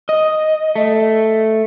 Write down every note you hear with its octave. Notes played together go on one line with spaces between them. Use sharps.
D#5
A3